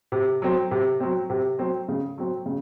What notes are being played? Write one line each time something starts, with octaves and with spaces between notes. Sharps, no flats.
C3
F#3 C4
C3
F#3 C4
C3
F#3 C4
C#3
F#3 C4
C#3